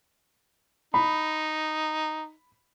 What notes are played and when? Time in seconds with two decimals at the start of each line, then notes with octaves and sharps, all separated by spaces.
0.94 D#4 B5